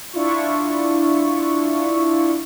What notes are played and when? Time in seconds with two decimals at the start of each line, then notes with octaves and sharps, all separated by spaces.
0.13 D4 E4 F4 C#6